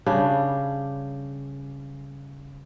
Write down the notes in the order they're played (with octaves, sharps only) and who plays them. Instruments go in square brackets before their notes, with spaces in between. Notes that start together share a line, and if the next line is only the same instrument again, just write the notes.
[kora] C#3 G3 D4